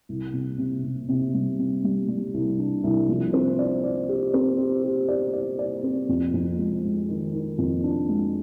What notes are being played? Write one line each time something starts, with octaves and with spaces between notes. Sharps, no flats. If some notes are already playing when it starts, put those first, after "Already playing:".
C2
C3
C3
C3
C3
G3
C3
G3
G3
C2
D4
C2
F3
C4
D5
D5
G4
C4
G4
G4
D5
D5
D5
C4
F2
F2
G#3
G#3
D#3
D#3
F2
D4
G#3